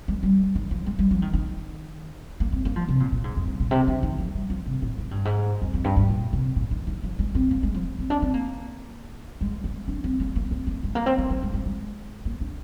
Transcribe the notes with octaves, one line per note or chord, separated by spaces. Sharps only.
G#3
G3
D#3
F3
G#3
G3
F3
D#3
D#3
A#3
C4
A#3
F3
C3
A#2
A#2
G#2
F2
G2
A#2
C3
D3
D#3
F3
G3
F3
C3
A#2
G#2
G2
G#2
F2
F2
G2
G2
A#2
C3
A#2
D#3
D#3
F3
G#3
C4
A#3
G#3
F3
C4
D4
C4
A#3
G#3
A#3
D4
C4
A#3
A#3
C4
A#3
G#3
A#3
C4
C4
A#3
G#3
G#3
G#3
A#3
D4